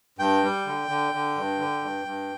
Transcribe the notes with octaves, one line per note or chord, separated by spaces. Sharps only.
G2 G5
G3
D3
D3
D3
G2
D3
G2
G2